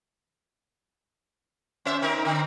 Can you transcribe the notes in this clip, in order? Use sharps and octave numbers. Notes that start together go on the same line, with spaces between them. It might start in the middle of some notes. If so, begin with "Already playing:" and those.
C#4 C5 E5
C4 D#4 A#4
D3